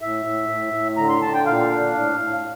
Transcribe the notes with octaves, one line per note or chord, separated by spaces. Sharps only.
A2 E5
A2
A2
A2
D3 A#5
C6
D3 A5
G5
A#2 F5
D4
A2
A2